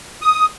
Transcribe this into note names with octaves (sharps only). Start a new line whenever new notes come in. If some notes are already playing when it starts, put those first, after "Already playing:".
D#6